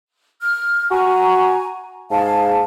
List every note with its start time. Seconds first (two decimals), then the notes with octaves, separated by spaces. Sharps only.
0.41 F6
0.91 F#4 G#5 A#5 C#6
2.10 G#2 G#4 F5 A5